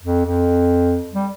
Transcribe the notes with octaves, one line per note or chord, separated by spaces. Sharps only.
F2
F2
G3